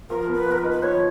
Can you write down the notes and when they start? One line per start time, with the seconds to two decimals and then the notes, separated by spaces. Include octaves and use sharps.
0.10 F3 A#4
0.28 B3
0.34 B4
0.46 F3
0.51 A#4
0.58 B4
0.64 D#4
0.71 B4
0.83 F3 C#5